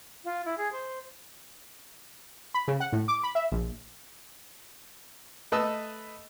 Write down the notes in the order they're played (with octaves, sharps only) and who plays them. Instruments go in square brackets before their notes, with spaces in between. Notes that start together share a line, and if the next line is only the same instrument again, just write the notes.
[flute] F4
E4
G#4
C5
[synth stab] B5
C#3
F#5
A2
D6
B5
E5
A#1
[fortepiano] A3 B4 D#5 A5 E6